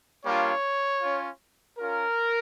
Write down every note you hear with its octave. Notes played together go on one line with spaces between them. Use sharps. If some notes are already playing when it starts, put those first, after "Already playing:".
G3 A#3 D4 F4 C#5
C#4 F4
C#4 F4 A#4